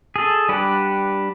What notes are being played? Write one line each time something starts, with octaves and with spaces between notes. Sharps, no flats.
G#4 A4
G3 D4 G4 B4 F#5